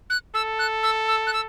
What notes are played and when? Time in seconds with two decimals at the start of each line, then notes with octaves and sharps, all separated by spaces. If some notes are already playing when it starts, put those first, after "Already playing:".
0.10 F#6
0.35 A4 E6
0.59 F#6
0.83 E6
1.08 E6
1.27 F#6
1.33 E6